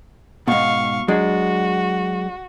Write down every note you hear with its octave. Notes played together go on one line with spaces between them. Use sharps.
G#2 B2 F5 C#6
F#3 G#3 D4 F#4